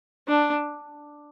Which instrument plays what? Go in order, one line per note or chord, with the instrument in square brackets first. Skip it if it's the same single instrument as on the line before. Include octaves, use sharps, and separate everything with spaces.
[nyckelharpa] D4